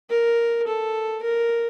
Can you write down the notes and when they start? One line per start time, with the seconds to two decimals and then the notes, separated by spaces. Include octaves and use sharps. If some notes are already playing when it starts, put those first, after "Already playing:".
0.10 A#4
0.67 A4
1.23 A#4